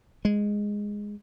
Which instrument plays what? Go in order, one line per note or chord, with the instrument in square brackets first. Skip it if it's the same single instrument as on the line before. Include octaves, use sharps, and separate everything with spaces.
[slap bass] G#3